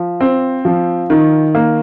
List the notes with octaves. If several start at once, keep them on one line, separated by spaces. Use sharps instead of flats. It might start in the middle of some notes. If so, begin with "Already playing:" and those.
Already playing: F3
C4
F3
D#3
A#3